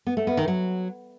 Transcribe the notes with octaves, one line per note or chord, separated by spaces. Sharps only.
B3
A3
B3
D#3
F#3